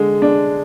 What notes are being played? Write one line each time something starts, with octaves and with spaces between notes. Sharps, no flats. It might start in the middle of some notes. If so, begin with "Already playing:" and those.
Already playing: D3 G#3
D4